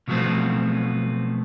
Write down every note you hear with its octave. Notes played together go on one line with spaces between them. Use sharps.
B2 F3 F#3 A3 B3 C4